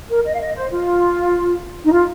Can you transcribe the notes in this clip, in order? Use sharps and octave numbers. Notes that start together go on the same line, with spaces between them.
A#4
D#5
F5
D#5
C5
F4
D#4
F4